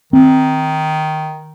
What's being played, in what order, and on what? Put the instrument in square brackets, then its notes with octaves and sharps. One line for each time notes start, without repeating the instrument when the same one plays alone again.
[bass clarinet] D#3 [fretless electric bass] C4